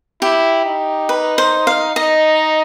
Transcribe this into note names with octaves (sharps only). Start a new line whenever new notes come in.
E4 G4
D#4
B4
C5
F5
D#4 D#5